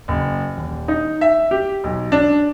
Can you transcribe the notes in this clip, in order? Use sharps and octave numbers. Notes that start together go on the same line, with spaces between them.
F#1
D#1
D#4
E5
G4
B1
D4